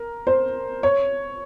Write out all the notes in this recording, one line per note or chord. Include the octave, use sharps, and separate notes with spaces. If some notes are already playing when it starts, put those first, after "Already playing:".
Already playing: A#4
C5
C#5